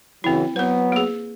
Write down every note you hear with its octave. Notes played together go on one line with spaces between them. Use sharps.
C#3 E3 F#3 C4 E4
F#3 B3 B4 C5
A#3 G#4